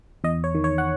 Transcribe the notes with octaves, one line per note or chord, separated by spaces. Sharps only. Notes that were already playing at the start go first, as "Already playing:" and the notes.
E2 D#5
C#5
D#3
C#5
F#5